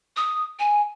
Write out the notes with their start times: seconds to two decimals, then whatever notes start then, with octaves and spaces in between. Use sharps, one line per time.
0.17 D#6
0.59 G#5